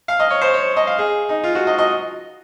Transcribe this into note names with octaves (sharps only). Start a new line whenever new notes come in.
F5
D#5
C#5
C5
C#5
D#5
F5
G#4
D#4
F4
F#4
D#5
D#5